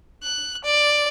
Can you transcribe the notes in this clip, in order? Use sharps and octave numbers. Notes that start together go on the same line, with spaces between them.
F#6
D5